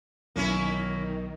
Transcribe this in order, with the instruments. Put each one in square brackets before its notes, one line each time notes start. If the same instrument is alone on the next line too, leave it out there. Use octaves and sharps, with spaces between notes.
[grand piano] B1 [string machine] D#3 [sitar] A#3 C#4 E4